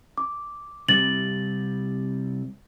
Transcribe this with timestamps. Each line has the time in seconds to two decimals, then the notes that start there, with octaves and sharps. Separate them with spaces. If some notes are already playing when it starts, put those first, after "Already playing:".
0.18 D6
0.89 C3 G3 C4 A6 F#7